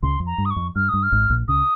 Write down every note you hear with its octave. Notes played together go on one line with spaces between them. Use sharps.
C#2 C#3 C6
F2
A#5
G2
D#6
C#6
F2
G2 F6
G2 D#6
F6
G#1 G#2
A#1 A#2
C#2 C#3 D#6